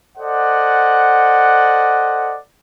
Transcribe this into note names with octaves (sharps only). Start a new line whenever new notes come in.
A4 C5 D5 D#5 F#5